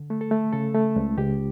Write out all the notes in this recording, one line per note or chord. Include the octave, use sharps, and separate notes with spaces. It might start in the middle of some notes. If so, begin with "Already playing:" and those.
Already playing: D3
A3
A4
A3
C#3 A4
A3
C#2
C#2 G4